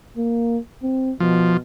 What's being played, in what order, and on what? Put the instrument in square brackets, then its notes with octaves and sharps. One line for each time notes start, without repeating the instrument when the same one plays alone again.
[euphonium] A#3
C4
[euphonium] B2 [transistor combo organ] F3